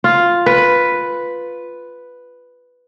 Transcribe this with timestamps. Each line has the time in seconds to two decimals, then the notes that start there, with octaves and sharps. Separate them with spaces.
0.04 F4
0.46 B4